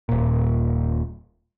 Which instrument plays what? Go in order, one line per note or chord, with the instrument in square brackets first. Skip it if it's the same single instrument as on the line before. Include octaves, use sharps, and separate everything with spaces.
[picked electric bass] D#1 A#2